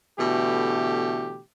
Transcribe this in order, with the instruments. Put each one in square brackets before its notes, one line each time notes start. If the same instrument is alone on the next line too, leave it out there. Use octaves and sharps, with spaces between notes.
[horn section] B2 D3 E3 A3 G4